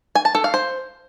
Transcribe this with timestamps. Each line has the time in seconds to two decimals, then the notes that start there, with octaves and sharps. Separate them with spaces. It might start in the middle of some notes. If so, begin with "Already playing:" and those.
0.15 G#5
0.25 A5
0.35 A4
0.44 F5
0.54 C5